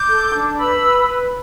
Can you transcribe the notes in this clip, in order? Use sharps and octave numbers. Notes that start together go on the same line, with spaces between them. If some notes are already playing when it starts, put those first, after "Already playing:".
Already playing: D6 G6
A4
D4
B4 B5 E6
B4
B4